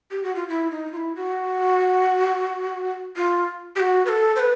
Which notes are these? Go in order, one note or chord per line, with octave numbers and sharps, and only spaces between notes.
G4
F#4
F4
E4
D#4
F4
E4
F#4
F4
G4
F#4
B4
A4
C5
B4